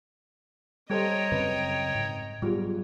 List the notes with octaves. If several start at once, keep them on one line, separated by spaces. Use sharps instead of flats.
G3 A4 C5 C#5 D#5 G5 A#5
F#2 C#3 C4 B4
G#2
G#2 F#3 G3 B3 F4 G#4